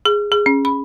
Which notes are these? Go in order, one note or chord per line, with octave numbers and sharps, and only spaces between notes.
G#4
G#4
C#4
B5